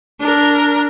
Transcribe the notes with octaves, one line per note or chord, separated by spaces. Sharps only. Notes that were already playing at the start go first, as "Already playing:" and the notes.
D4 A#4